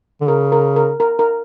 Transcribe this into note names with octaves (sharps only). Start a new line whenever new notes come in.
D3
C#3 A#4
A#4
A#4
A#4
A#4